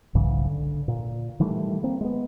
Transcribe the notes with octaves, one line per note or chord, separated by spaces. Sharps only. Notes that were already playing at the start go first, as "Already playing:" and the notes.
B1 G#2 C#3 E3
D3
A#2
D#3 E3 G3 A3
A#3 C4
G#3 B3